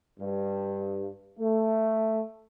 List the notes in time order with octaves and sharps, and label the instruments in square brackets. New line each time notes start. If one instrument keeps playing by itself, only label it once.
[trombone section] G2
A3